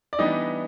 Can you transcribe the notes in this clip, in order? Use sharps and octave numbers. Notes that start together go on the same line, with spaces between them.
D5
E3 G3 B3 D4 D#4 D#5